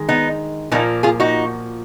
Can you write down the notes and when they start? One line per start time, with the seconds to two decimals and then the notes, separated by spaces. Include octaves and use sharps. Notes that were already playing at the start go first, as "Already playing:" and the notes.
Already playing: D#3 G#3
0.09 B3 D#4
0.71 A#2 F3 A#3 B3 D#4
1.03 F4 G#4
1.20 D#4 F#4